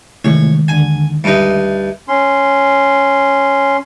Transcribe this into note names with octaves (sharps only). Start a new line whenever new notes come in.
C3 D#3 E3 G#3 A3 C#5
D#2 D3 G#5
D2 G2 D#4 E5
C#4 C6